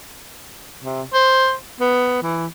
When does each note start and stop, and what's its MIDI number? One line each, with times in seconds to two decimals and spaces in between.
0.84 1.03 48
1.13 1.54 72
1.81 2.23 59
2.23 2.47 52